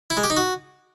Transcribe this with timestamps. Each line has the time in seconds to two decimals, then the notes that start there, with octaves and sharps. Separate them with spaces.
0.10 E4
0.17 G#3
0.23 G4
0.30 D#4
0.37 F#4